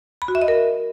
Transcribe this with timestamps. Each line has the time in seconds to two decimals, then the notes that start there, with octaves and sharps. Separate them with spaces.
0.22 B5
0.28 F#4
0.35 E5
0.42 D#5
0.48 A#4